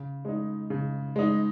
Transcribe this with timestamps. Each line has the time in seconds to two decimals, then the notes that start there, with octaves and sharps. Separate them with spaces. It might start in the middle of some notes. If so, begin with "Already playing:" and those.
Already playing: C#3
0.25 G#3 D#4
0.70 C#3
1.16 G#3 D#4